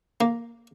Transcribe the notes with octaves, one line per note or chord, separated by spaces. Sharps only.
A#3